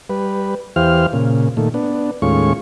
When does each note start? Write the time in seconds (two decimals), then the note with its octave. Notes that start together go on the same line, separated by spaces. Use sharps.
0.10 G3 B4
0.76 E2 E3 G4 C5 F5 F6
1.13 A#2 C#3
1.57 A#2 D#3 A3
1.74 B3 D4
2.22 D#2 A2 G#3 C#4 F4 C#6